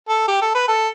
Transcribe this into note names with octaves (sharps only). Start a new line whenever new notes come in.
A4
G4
A4
B4
A4